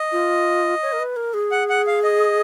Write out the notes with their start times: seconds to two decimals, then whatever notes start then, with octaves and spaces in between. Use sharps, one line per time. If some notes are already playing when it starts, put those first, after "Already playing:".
Already playing: D#5
0.12 F4
0.82 C#5
0.93 A#4
0.99 B4
1.16 A#4
1.34 G#4
1.51 F#5
1.70 F#5
1.87 F5
2.04 D#5